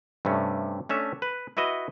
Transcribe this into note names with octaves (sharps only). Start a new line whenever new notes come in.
G2 C3 A3 C#4
A3 C#4 D4 E5
B4
E4 F#4 B4 D#5 E5